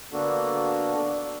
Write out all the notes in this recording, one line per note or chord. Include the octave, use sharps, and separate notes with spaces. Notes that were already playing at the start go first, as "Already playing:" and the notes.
D3 A#3 B3 D4 F#4 A4